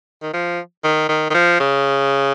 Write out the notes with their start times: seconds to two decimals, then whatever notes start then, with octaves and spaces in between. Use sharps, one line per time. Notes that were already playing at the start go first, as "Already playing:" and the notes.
0.22 D#3
0.33 F3
0.84 D#3
1.09 D#3
1.30 D#3
1.34 F3
1.60 C#3